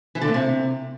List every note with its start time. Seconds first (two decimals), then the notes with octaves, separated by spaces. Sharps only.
0.15 E3
0.21 D3
0.28 A2
0.34 C3